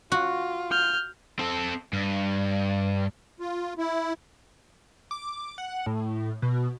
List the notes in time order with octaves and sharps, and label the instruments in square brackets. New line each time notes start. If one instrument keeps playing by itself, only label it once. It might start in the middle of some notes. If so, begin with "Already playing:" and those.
[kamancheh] F4 [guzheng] F#4
[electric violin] F6 G6
[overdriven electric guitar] C4 A4
G2
[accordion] F4
E4
[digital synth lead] D6
F#5
A2
B2